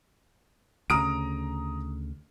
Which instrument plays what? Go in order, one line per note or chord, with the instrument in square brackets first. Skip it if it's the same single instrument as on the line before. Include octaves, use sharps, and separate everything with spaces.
[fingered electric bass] D2 C#3 [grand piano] A#5 D#6 D7